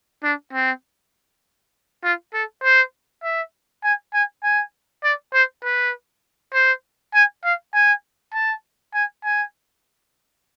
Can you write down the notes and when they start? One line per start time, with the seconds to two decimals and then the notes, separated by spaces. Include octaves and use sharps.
0.24 D4
0.53 C4
2.04 F4
2.34 A4
2.63 C5
3.23 E5
3.84 G#5
4.14 G#5
4.44 G#5
5.04 D5
5.34 C5
5.64 B4
6.54 C5
7.14 G#5
7.44 F5
7.74 G#5
8.34 A5
8.94 G#5
9.24 G#5